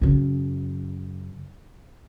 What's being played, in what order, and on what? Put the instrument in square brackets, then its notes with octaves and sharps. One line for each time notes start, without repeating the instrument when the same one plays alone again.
[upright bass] F#2 C#3